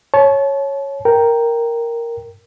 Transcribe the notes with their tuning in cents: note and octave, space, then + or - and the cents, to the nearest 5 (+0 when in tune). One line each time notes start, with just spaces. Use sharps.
C#5 -5 A5 -35
A#4 +0 G5 +0